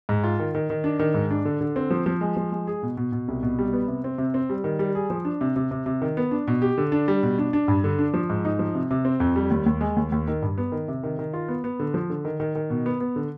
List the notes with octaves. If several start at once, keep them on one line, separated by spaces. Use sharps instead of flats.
G#2
F4
D#3
D#3
D#3
D4
D#3
G#2
D4
D3
D3
C4
F3
F3
G#3
F3
G#3
G#4
B2
B2
B2
C2
B2
G3
B3
C3
C4
C3
C4
G3
D#3
G3
G#4
F3
D4
C3
C3
C3
C3
D#3
B3
D4
B2
G4
D3
D4
G3
B2
D4
D4
G2
D3
D4
F3
G#2
D#4
F3
C3
C3
C4
F2
G3
D#2
D#2
G#3
D#2
D#2
D#3
G2
B3
D#3
C3
D#3
D#3
F4
B3
B3
D3
F3
D3
D#3
D#3
D#3
B2
B3
B3
D3